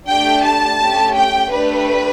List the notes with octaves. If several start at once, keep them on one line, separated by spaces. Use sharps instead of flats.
A3 D4 G4 G5
A5
A3 C#4 G4
G5
A3 D4 G4 B4